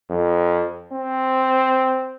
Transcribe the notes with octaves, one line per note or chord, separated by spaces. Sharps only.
F2
C4